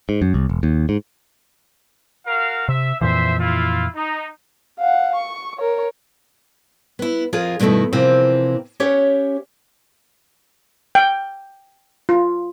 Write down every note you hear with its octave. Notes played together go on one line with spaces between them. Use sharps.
G#2
F#2
C2
E1
D#2
G#2
F#4 A#4 F5
C3 E5
F2 A#2 E3 C5 E5
E4 F4
D#4
F5 F#5
C#6
A#4 C#5
B3 E4
F2 F4 G#4 A#4
G2 B2 D#3 A3 E4
C3 E3 F3 A#3 C4
C#4 G4 C#5 E5 F#5
G5
F4